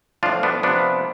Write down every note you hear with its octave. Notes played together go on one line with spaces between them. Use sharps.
A2 F3 D4 F4
B3 D4
C3 F3 B3 D4